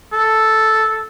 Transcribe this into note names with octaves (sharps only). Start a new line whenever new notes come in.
A4